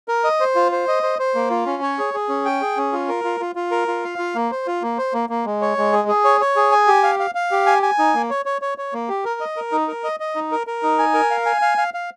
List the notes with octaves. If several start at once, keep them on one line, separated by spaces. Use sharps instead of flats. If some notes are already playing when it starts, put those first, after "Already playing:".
A#4
D#5
C5
F4
C5
D#5
C5
C5
A#3
F4
C#4
C#5
G#4
G#4
C#4
G5
G#4
C#4
F4
A#4
F4
F4
F4
A#4
F4
F5
F4
A#3
C5
F4
A#3
C5
A#3
A#3
G#3
C#5
G#3
G#4
G#4
C#5
C#5
G#4
G#5
G4
F5
F5
F5
G4
G#5
G#5
D#4
A#3
C#5
C#5
C#5
C#5
A#3
G4
A#4
D#5
A#4
D#4
A#4
D#5
D#5
D#4
A#4
A#4
D#4
G#5
A#4
F5
G#5
F5
F5
F5